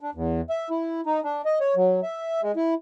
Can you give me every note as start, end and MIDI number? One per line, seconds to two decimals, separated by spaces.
0.01 0.10 62
0.15 0.41 40
0.50 0.69 76
0.70 1.01 64
1.06 1.20 63
1.24 1.42 62
1.45 1.59 75
1.60 1.75 73
1.76 2.00 54
2.03 2.41 76
2.42 2.52 56
2.56 2.74 64